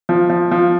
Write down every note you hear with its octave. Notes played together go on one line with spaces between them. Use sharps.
F3
F3
F3